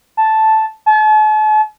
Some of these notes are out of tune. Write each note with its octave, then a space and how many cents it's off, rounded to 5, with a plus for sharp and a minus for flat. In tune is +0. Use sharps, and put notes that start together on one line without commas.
A5 -5
A5 -40